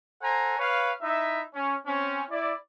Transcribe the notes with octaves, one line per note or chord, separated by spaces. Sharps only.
A4 C5 F#5 G#5 A#5
B4 C#5 F5
D#4 E4 E5
C#4
C4 C#4
E4 D5